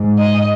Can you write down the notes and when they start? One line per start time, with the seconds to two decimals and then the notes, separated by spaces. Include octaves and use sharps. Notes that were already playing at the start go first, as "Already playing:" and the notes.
Already playing: G#2
0.19 D#5